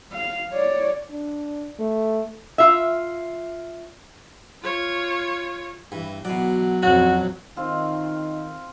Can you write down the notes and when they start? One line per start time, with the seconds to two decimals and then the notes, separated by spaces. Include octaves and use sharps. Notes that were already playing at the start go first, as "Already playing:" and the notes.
0.12 F5
0.52 C#5 D5
1.10 D4
1.79 A3
2.58 F4 E5
4.62 F4 C#5
5.92 G2 E3
6.25 B2 E3 F#3 D5
6.83 A#1 F2 C#4 F#4
7.57 D#3 C4 F4